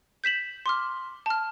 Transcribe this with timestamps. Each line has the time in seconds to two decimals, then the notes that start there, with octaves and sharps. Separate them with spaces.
0.24 G6 B6 E7 F#7
0.66 C6 D6 F6
1.26 A5 F6